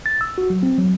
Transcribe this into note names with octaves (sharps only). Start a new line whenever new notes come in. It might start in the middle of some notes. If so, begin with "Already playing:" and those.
A6
E6
F#4
F#3
C4
F#3